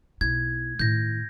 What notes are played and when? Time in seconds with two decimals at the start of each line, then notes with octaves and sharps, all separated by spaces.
0.21 B1 E4 G#6
0.79 A2 D#3 G6 A#6